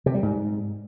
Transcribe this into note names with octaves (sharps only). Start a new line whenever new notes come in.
C3
G3
G#2